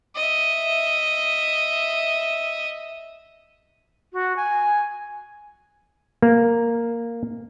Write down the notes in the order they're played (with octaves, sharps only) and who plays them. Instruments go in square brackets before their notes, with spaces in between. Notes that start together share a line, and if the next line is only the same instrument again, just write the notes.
[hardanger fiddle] D#5 E5
[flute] F#4
G#5
[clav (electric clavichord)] A#3